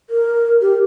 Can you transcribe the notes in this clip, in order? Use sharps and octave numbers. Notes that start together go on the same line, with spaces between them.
A#4
G4